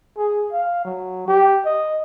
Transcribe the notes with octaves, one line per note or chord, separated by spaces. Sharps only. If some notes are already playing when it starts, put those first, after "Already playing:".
G#4
F5
F#3
G4
D#5